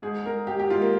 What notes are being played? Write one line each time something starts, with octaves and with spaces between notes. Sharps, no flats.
G#2 G#4
G#2 A#4
G#2 G4
G4
G#2 F4
A#3